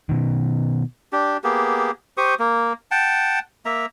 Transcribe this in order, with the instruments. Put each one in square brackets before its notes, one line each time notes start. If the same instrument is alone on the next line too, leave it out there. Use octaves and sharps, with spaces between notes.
[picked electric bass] B2 D#3
[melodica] D4 G4
A#3 B3 G4 G#4
G4 C5 C#6 D#6
A#3
F#5 G5 A5
A#3 E5 A#5